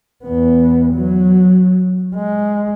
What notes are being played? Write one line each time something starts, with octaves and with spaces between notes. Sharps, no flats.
E2 B3
F#3
G#3